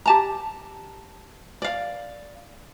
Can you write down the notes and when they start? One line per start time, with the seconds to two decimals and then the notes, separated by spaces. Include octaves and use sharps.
0.06 G4 A5 A#5
1.62 D5 F5